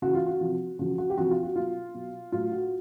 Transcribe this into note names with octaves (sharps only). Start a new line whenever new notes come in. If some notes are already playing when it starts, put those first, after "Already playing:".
C#3 E3 F#4
F4
F#4
C3 F3
C#3 F3 F#4
F#4
G4
C3 F3 F#4
F4
F#4
B2 F#3 F4
B2 F#3
A2 F#3 F4
F#4